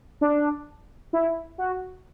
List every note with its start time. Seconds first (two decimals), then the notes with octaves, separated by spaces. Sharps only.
0.21 D4
1.13 E4
1.58 F#4